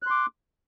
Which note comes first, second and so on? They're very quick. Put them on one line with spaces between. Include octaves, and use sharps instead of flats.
F#6 C6 D6